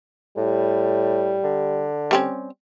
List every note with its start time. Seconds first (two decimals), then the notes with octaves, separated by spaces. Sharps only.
0.37 A2 G3
1.44 D3
2.11 G3 C4 C#4